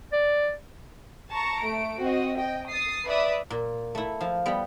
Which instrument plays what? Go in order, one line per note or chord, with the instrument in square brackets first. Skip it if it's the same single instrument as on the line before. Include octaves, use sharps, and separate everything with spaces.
[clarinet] D5
[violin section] A5 A#5 C#6
A3 D7
C4 F#4 D#5
D#5 G5
D#6 A6 C7
B4 D5 E5 D#6
[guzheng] A#2
A3 E4
F3
G3 B3